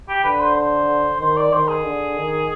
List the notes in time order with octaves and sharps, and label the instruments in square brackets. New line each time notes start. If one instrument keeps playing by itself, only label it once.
[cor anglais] G4
[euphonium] D3 [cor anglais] B4
[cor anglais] C5
C5
[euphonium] D#3 [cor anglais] C5
[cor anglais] D5
[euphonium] D#3 [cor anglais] C5
[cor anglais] G#4
[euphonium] D3
D#3